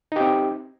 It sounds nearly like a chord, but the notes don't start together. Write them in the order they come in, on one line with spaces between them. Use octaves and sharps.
D#4 G4 C4